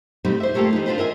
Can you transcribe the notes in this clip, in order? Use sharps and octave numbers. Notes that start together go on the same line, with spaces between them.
B2 G3 A3 C4 D#4
C5 E5
G3 A3 A#3 F4 G4 A4
E3 D#4
D4 F4 F#4 A4 B4 C5
A#4 D#5 E5 G#5